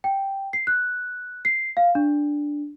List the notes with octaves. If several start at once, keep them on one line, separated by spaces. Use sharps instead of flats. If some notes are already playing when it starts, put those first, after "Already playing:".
G5
C7
F#6
C7
F5
D4